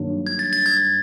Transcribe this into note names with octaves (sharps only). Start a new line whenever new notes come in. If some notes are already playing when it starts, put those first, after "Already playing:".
Already playing: G2 D#3 F#3 A#3 D4
G#6
A6
A6
G#6